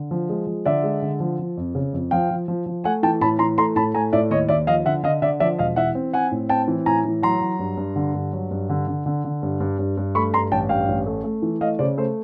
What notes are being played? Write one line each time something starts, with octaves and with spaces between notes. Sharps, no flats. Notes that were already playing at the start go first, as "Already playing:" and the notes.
Already playing: D3
F3
G#3
F3
D3 D5 E5
G#3
D3
F3
F3
F2
C#3
F2
F3 F5 G5
F3
F3
F3
A3 F#5 G#5
E3 G5 A5
A2 A5 B5
E3 A#5 C6
A3 A#5 C6
A2 A5 B5
A3 G#5 A#5
A2 D5 E5
D#2 C#5 D#5
D#2 D5 E5
F3 D#5 F5
D3 E5 F#5
D3 D#5 F5
D3 D5 E5
F3 D5 E5
E1 D#5 F5
E3 E5 F#5
C4
C4 F#5 G#5
A2
C4 G5 A5
E3
A2 G#5 A#5
E3
F#3 A#5 C6
F#3
G2
G2
D3
G2
F#3
G2
D3
D3
D3
D3
G2
G2
G2
G2
A3 B5 C#6
G2 A#5 C6
A1 G5 A5
G2 F5 G5
A1
A3
A3
E3
A3 D#5 F5
C#3 C5 D5
A3 C5